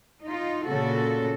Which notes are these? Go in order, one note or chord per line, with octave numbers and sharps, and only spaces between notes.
D#4 F4
A#2 C#3 F#4 A4